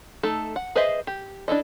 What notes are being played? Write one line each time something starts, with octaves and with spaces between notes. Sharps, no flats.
A3 D#4 A4
F#5
G#4 B4 C5 D#5 E5
G4
D4 E4 A4 D#5